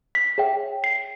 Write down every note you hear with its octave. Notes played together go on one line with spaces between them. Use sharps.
B6
G#4 C#5 E5 G5
C7